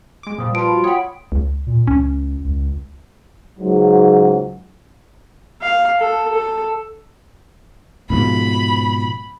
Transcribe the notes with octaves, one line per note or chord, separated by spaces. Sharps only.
G#3 D6
A#2 F3 G3 D#6
F4 B4 A5 D7
F#4 B5
C#5 F#5 G5 B5 D#6
C#2
A#2
C#2 C#4
C#2
C#2 G#2 F#3
F5
A4
A4
G#2 B2 F3 B5